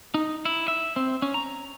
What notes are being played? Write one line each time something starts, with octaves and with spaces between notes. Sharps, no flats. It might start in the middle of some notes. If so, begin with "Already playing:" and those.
D#4
E4
E5
C4
C#4
A#5